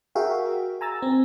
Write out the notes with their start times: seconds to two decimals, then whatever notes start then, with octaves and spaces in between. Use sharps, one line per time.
0.15 F#4 G#4 A#4 E5 F5 G5
0.81 G#5 A#5 E6 A6
1.02 C4